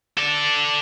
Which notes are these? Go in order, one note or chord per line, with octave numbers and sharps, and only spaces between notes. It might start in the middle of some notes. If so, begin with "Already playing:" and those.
A4 D5